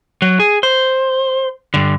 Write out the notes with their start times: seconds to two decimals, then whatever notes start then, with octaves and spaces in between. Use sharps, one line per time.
0.22 F#3
0.40 G#4
0.63 C5
1.74 G2 D3